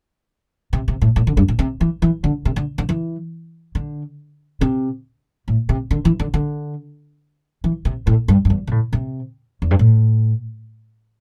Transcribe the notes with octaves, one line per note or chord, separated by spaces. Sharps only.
C3
C3
A2
A2
D3
G2
A2
C3
E3
E3
D3
C3
D3
D3
E3
D3
C3
A2
C3
D3
E3
D3
D3
E3
C3
A2
G2
G2
E2
C3
A2
C3
E2
G2
A2